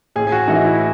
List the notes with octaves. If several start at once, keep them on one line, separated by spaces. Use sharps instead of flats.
A1 G#4
G#4
F#4
A2 E3 D#4
E4